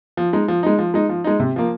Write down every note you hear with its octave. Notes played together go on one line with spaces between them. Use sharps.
F3
G#3 D#4
F3
G#3 D#4
F3
G#3 D#4
F3
G#3 D#4
C3
F3 A#3